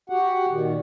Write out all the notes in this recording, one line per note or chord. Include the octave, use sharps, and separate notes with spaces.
F#4 G4 F#5
A#2 D#3